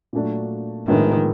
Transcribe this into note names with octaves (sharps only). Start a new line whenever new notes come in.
A#2 F#3 A3 D4 F#4
A#1 A2 D#3 F3 G#3 B3